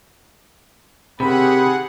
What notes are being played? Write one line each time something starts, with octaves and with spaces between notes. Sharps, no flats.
C3 D#3 C4 G4 G#4 F#5 B5